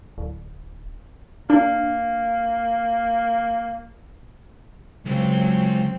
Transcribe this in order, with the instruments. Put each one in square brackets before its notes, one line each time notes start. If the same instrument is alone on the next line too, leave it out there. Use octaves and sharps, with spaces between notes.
[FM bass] D1
[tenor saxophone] A#3 [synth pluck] D4
[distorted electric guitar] C#2 G#3 [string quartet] F#3 C4